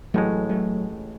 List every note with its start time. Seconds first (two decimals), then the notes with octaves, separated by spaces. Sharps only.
0.14 A1 A2 F#3 G#3 A3
0.49 F#3 A3